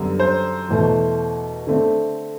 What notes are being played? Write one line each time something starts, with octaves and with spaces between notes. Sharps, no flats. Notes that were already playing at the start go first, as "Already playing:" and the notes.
Already playing: F#2 D3 G3 B3
C5
E2 B2 A3
D3 A3 C4